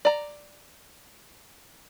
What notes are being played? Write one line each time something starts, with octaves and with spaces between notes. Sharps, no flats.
D5 A#5